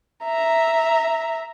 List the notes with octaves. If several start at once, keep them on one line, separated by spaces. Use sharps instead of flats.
E5 A#5